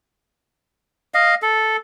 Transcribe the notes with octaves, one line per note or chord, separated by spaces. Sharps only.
D#5 F5
A4